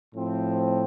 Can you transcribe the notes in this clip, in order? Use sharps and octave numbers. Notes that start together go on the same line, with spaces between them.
A2 F3 C4